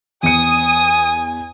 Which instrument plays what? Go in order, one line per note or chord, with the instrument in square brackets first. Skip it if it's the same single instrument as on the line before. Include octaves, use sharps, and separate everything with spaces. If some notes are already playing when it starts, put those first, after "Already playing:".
[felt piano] E2 C#7 [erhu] G#5 [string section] D#6